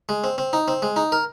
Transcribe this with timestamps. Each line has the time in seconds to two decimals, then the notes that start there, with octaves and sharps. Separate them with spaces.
0.09 G#3
0.24 C4
0.38 C4
0.53 D#4
0.68 C4
0.82 G#3
0.96 D#4
1.12 A#4